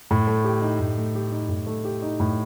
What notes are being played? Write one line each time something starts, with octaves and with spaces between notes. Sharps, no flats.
A2
A3
G4
D#4
A2
A3
G4
D#4
A2
A3
G4
D#4
A2